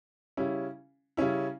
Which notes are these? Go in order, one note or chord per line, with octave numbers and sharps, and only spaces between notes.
C#3 G3 C#4 E4
C#3 G3 C#4 E4